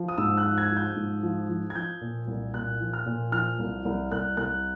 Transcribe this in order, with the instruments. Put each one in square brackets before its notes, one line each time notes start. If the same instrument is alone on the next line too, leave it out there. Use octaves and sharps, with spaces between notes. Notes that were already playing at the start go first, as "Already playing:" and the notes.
Already playing: [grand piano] F3
D#6
G#2 E6
F#6
F3
G#6
F3
G6
G#2
F3
F3
G#6
F3 G6
A#2
C2
A#2 F#6
F3
F6
A#2
F3 F6
C2
C2
C2 F#6
C2 F#6